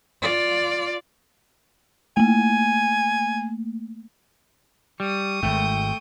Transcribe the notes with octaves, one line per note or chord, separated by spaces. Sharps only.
F4 D5
A3 A#3 G#5
G3 C#6 D#6
G#1 G#2 A3 G5